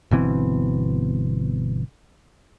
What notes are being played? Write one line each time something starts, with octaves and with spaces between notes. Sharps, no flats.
G1 B2 E3 C4